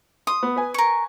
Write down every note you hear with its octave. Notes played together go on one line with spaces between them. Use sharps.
C6 D#6
B3
B4 G#5
A#4 C#6